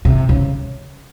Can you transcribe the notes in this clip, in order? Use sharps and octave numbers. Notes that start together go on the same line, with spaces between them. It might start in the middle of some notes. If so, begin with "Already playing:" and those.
C3
C#3